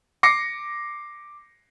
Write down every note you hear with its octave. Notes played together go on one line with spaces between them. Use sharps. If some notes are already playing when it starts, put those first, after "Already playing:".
D6 A#6 C7 C#7